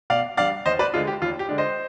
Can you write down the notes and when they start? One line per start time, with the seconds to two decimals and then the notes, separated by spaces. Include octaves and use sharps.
0.10 B2 D5 F5
0.37 G3 D4 D5 F5
0.65 D#2 C5 D#5
0.79 B4 D5
0.93 D3 G#3 D4 F4
1.07 G4
1.21 D#2 F4
1.39 G4
1.49 D3 G#3 D4
1.58 C5 D#5